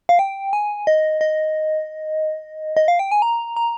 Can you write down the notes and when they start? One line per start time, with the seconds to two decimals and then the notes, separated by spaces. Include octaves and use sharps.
0.09 F5
0.19 G5
0.53 G#5
0.87 D#5
1.21 D#5
2.77 D#5
2.88 F5
2.99 G5
3.11 G#5
3.22 A#5
3.57 A#5